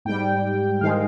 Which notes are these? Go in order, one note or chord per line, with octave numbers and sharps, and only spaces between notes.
G#2 G3 G5
G#2 D#3 G#3 F5